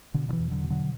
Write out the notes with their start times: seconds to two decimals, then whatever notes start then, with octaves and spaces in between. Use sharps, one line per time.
0.14 B2 D3
0.29 D3
0.33 E3
0.39 E2
0.51 D3 F#3
0.64 B2
0.70 D3 F#3